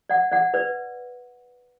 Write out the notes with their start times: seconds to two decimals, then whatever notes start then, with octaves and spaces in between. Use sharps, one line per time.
0.09 D5 F#5
0.31 D5 F#5
0.54 B4 D5